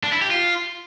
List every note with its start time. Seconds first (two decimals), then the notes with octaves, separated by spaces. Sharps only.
0.03 D4
0.12 E4
0.22 G4
0.31 F4